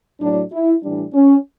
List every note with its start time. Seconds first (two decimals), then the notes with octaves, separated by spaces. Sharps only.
0.20 A2 F#3 D4
0.52 E4
0.82 A2 E3 G3 D4
1.13 C#4